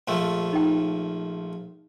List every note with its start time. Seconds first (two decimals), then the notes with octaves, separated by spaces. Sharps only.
0.08 A#1 F3 A3
0.53 D#4 G5